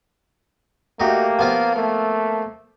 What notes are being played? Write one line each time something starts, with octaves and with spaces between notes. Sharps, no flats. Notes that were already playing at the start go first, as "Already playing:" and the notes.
A3 A#3 D#4 F#4 G4
F3 B3 F4
A3 A#3